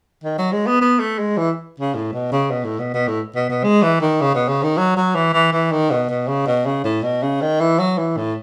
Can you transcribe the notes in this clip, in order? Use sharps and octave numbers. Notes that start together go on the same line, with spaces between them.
D#3
F#3
G#3
B3
B3
A3
G#3
E3
C#3
A2
B2
C#3
B2
A2
B2
B2
A2
B2
B2
G#3
E3
D#3
C#3
B2
C#3
D#3
F#3
F#3
E3
E3
E3
D#3
B2
B2
C#3
B2
C#3
A2
B2
C#3
D#3
E3
F#3
E3
A2